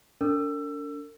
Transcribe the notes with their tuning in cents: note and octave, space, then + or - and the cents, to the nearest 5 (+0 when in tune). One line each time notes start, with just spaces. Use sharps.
D4 -40 A#4 -45 E6 +20